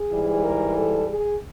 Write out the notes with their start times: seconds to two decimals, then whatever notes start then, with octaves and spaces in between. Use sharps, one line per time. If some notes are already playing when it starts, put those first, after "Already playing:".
Already playing: G#4
0.13 G#2 E3 G3
0.44 A#4
0.76 A4
1.08 G#4